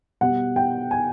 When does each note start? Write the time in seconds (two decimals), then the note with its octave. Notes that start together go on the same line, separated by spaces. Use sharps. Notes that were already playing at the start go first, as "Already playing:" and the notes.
0.21 B2 G3 B3 F#5
0.56 G5
0.91 G#5